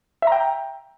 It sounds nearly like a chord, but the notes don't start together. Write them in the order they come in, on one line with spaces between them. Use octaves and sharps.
E5 A#5 G5